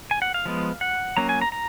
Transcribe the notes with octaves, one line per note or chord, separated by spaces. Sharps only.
G#5
F#5
F5
F3 G#3 B3
F#5
F#3 A#3 C#4 A#5
G#5
A#5
A#5